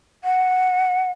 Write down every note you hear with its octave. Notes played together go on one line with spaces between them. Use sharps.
F#5